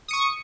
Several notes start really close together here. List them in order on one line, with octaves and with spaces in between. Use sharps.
D#6 C#7 C#6